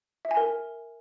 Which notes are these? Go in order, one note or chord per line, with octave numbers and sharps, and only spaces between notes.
E5
G#5
A#4